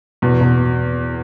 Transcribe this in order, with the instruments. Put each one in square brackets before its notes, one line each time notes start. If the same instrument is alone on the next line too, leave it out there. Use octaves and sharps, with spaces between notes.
[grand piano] E2 [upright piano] B2
[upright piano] B2